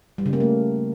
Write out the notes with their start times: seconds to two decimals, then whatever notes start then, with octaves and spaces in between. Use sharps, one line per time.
0.18 G3
0.26 C#3
0.33 A#3
0.40 A3